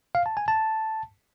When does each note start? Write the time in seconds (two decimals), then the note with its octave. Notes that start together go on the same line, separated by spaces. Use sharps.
0.15 F5
0.26 A5
0.37 G#5
0.48 A5